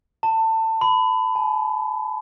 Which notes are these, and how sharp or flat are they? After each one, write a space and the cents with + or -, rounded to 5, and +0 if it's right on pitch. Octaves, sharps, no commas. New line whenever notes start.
A5 +25
B5 +20
A5 -45